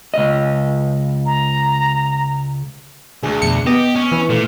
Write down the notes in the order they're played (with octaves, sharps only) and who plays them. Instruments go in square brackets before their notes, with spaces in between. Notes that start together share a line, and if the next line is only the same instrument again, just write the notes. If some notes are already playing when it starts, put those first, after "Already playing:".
[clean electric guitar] C#2 D#5
[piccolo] A#5
[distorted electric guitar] D2 [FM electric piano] G#4
[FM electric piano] F2 B2 [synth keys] C#7
[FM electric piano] B3 [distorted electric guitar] G4 [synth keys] D#5
[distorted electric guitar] C#4
[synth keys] E3
[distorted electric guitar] A#2 [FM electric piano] A3